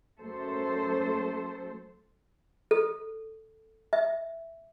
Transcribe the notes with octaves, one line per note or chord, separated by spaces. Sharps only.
F#2 A3 A4 C5
A4
E5